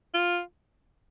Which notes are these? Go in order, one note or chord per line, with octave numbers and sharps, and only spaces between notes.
F4